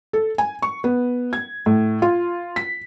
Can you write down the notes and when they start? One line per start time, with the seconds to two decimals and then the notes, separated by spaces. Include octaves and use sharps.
0.13 A4
0.38 G#5
0.62 C#6
0.84 B3
1.33 G#6
1.66 A2
2.02 F4
2.56 B6